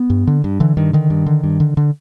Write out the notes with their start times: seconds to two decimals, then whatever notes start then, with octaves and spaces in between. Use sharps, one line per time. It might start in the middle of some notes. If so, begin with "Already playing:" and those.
Already playing: B3
0.10 G2
0.27 D3
0.44 G2
0.60 D3 E3
0.77 G2 D#3
0.93 D3 D#3
1.10 G2
1.26 D3
1.43 G2
1.60 D3
1.77 D3